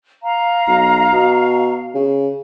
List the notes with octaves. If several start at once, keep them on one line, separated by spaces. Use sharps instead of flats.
F5 A#5
B1
B2
C#3